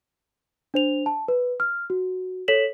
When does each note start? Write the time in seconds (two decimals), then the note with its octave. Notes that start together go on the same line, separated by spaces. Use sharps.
0.74 D4 C5 F7
1.06 A5
1.28 B4
1.60 F6
1.90 F#4
2.48 A4 C#5 B6 E7 F#7